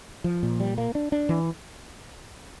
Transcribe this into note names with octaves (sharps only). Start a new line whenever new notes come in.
F3
A#2
G3
A#3
D4
D4
E3